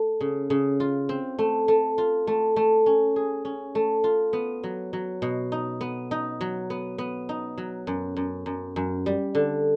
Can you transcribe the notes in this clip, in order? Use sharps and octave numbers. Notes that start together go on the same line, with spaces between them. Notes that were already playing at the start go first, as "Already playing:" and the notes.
Already playing: A3
C#3
C#3
F4
C4
A3
A3
F4
A3
A3
C#4
G#4
C#4
A3
F4
B3
F#3
F#3
B2
D#4
B3
D#4
F#3
B3
B3
D#4
F#3
F#2
F#2
F#2
F#2
G3
D3